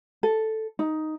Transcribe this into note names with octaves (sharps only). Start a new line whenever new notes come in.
A4
D#4